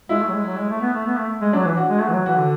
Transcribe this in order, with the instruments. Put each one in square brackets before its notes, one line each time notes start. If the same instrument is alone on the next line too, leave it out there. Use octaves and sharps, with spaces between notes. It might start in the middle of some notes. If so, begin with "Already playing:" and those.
[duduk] G#3 [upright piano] E4
[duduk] A3
F#3
G#3
F#3
G#3
A3
B3
A3
B3
A3
G#3
[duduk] F#3 [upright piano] D4
[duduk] E3
[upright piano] F#4
[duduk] G#3
[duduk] A3 [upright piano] F#4
[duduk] E3
F#3
[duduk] E3 [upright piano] F#4
[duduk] D3